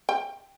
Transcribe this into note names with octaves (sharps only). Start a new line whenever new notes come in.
G5